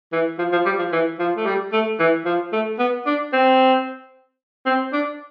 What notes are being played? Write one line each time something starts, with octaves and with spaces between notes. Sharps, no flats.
E3
F3
F3
G3
F3
E3
F3
A3
G3
A3
E3
F3
A3
B3
D4
C4
C4
D4